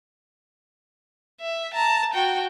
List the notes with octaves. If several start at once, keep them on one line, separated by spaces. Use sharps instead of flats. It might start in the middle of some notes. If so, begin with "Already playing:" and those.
E5
A5 A#5
F#4 G5